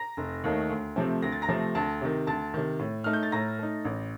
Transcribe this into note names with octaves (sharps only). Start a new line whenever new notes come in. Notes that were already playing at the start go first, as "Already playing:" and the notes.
Already playing: A#5 A#6
F1
D#2 D#3 A3 D#4
D2
C3 F3 A3 C4
D2 A#6
A6
A#5 A#6
C3 F3 A3 C4
D2 A5 A6
C3 D#3
D2 A5 A6
C3 D#3
A2
A3 D#4 F6
G6
A6
A2 A#5 A#6
A3 D#4
A1